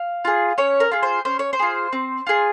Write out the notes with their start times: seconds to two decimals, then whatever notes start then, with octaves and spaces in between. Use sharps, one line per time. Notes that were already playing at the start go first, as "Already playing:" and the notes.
Already playing: F5
0.25 F4 G#4
0.58 C#4 C#5
0.80 A#4
0.91 F4 G#4
1.03 C5
1.25 C#4 C5
1.39 C#5
1.53 C5
1.59 F4 G#4
1.93 C4
2.27 F4 G#4